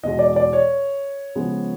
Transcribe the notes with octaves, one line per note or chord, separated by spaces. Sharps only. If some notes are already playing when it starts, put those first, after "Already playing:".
E2 B2 G#3 D#5
D5
D5
C#5
C#3 F3 G#3 B3